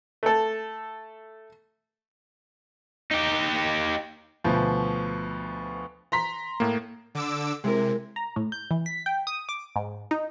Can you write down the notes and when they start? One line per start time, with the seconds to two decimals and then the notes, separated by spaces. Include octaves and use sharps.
0.23 A3 A4
3.11 D#4 G4
4.44 D2 B2 F3
6.12 A#5 C6 B6
6.60 A2 A#3
7.15 D3 D6 E6
7.64 C3 G#3 E4 A#4
8.16 A#5
8.36 A2
8.52 G6
8.71 E3
8.86 B6
9.06 G5
9.27 D#6
9.49 D6
9.76 G#2
10.11 D#4